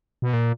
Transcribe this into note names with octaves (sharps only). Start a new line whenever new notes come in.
B2
A#2